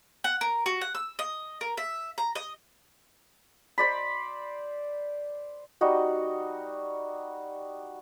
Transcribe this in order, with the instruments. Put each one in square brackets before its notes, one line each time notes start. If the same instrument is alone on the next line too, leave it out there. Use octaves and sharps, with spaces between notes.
[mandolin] F#5
A#4
F#4
F#5
E6
D#5
A#4
E5
A#5
D#5
[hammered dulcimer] C5 D5 B5
[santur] G3 D#4 F#4 D#5